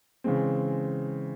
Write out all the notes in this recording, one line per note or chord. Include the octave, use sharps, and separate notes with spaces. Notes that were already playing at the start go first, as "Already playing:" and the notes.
C#3 E3 G#3 C4